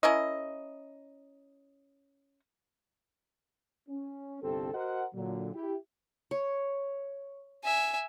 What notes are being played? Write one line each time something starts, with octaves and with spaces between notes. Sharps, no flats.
C#4 E4 A#4 D#5
C#4
G1 C2 C4 G4 A4
F#4 A#4 C5 D#5 F#5
A#2 D3 F#3
E4 G4
C#5
E5 G#5